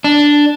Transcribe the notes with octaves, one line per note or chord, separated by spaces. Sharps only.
D4